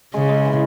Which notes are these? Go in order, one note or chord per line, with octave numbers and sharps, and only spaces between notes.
C#3 G#3
G#3
E3